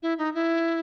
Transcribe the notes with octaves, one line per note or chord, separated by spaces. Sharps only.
E4
D#4
E4